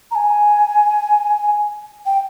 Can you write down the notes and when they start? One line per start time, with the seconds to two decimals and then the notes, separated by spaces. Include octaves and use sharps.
0.11 A#5
0.15 G#5
2.06 G5